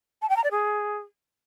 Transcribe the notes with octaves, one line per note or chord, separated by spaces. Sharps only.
A5
G5
A#5
D5
G#4